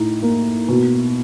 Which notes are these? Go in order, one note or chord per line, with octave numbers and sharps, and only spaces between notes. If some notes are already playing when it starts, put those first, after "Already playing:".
Already playing: A2 D#4
A#3
B2